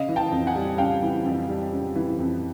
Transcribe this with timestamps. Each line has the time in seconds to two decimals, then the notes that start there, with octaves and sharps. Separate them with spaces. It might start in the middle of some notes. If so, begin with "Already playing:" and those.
Already playing: C#3 D#5 F5
0.09 E3
0.16 G5 A5
0.31 F2
0.47 F#5 G#5
0.55 G3
0.78 C#3 F5 G5
1.02 E3
1.26 F2
1.49 G3
1.73 C#3
1.96 E3
2.19 F2